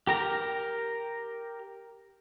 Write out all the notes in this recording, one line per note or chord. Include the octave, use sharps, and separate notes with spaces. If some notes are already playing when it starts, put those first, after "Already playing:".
G4 A#4 A#5